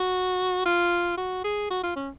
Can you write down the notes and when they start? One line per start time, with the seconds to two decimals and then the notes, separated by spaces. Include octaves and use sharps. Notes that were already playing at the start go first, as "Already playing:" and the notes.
Already playing: F#4
0.65 F4
1.17 F#4
1.44 G#4
1.70 F#4
1.83 F4
1.96 C#4